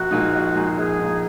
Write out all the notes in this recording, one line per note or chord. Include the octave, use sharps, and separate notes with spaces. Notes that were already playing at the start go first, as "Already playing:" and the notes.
Already playing: A#1 F#4
A#2 G#3 D#4
A#1
A#2 G#3 D#4
A#1 G#4
A#2 G#3 D#4